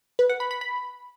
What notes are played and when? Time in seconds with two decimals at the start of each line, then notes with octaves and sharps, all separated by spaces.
0.19 B4
0.29 F#5
0.40 B5
0.51 B5
0.61 B5